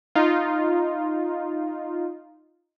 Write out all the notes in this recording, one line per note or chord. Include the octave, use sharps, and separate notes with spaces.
D#4 F4